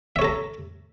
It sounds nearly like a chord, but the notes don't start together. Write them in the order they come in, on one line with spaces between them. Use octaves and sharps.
E5 C#5 A4 A#5